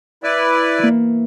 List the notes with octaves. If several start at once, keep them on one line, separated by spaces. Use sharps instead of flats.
E4 B4 D5 E6
E3 A#3